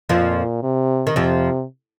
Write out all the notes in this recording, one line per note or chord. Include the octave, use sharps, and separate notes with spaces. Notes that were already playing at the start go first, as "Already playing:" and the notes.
F2 A#2 F3
C3
D#3
F2 C3 F3